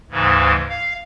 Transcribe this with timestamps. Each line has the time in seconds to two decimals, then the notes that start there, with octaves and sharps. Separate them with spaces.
0.11 D2 G#2 C#3 E3
0.69 F5